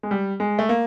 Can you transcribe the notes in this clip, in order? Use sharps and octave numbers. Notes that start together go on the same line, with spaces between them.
G#3
G3
G#3
A3
A#3